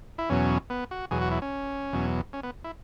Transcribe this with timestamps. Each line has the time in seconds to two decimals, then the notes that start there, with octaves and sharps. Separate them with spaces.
0.18 E4
0.29 E2 B2 F#3 C#4
0.70 B3
0.91 F#4
1.11 E2 B2 F#3 G#4
1.22 F#4
1.31 E4
1.42 C#4
1.93 E2 B2 F#3
2.33 C#4
2.43 B3
2.64 E4